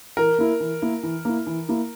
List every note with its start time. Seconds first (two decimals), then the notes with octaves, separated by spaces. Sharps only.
0.17 E3 A#4
0.38 A#3 E4
0.60 E3
0.82 A#3 E4
1.03 E3
1.25 A#3 E4
1.47 E3
1.68 A#3 E4